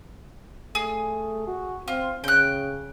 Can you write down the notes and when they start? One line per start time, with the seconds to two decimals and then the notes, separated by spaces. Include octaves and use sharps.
0.75 A3 G#4
1.47 F#4
1.88 C4 F4
2.24 C#3 G5 F#6